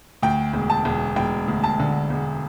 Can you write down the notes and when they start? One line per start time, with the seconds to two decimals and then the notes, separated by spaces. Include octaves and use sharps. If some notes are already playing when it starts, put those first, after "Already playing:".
0.22 D2 G5
0.53 E1
0.70 A5
0.85 E1
1.16 E1 G5
1.48 D2
1.64 A5
1.80 D3
2.10 E1